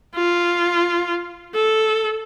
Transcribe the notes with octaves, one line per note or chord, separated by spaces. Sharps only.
F4
A4